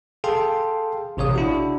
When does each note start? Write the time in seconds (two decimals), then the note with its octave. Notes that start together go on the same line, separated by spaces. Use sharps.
0.24 G#4 A4 F5 G5 A5 C6
1.17 A1 C3 G#4 C#5 F5 D#6
1.36 D4 E4 F#4